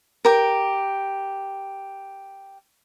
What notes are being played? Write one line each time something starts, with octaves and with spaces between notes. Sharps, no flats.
G4 A#4